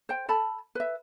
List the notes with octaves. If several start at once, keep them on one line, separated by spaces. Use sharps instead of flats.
C5 G5
A4 A5 B5
B4 E5